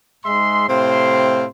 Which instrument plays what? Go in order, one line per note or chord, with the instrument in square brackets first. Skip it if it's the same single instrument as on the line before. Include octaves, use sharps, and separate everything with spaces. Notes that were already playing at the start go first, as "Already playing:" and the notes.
[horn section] G#2 G#3 E5 C6
A2 C3 C4 C5 F5 C6